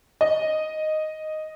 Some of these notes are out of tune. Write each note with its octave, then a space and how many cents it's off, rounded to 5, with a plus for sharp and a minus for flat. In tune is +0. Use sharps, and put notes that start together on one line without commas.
D#5 -5